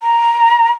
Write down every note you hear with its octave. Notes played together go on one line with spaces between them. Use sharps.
A#5